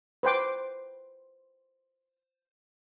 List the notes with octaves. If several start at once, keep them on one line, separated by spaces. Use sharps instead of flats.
B4 C5 G5 D6